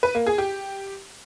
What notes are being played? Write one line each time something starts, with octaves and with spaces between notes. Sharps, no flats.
B4
A#3
G#4
G4